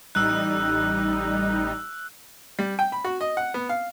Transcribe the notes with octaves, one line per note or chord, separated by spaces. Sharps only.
A1 G3 D#4 E6 F#6
G3
G5
B5
F#4
D#5
F#5
B3
F5